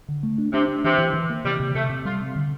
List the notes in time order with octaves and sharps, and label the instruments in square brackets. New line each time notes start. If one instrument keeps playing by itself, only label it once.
[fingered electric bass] D3
A3
D4
[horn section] C3 [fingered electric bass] D4
[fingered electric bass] D4
[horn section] C3 [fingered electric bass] E3
[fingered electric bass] E3
E3
A#3
[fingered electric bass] C3 [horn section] G3
[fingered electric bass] C3
[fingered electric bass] C3 [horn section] A3
[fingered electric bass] C3
[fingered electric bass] G3 [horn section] F4
[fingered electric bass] C4
D3